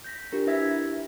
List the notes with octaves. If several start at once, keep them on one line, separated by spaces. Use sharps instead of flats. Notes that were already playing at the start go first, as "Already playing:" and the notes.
G6 A#6 B6
D4 F4 G4 A#4
E4 B4 E5 E6 G#6 B6